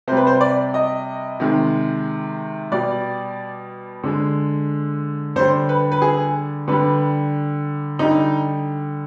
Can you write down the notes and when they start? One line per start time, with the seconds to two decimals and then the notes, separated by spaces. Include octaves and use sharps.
0.07 C3 C5
0.12 G3 B4
0.27 C5
0.41 D5
0.74 D#5
1.40 C3 D#3 G#3
2.72 B2 G3 D5
4.04 D3 G#3
5.36 D3 G3 C5
5.69 B4
5.92 B4
6.02 G#4
6.68 D3 G3 B4
7.99 D3 G3 D#4